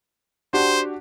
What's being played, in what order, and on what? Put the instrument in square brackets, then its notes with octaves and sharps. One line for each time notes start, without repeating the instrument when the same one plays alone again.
[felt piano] D4 F#4 G4 [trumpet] C5